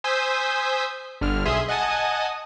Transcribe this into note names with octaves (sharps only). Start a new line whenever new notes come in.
C5 G#5 D#6 E6 G6 B6
G1 D3 F6
B1 G#4 E5 C6 D#6
D#5 F#5 G#5 A5 D#6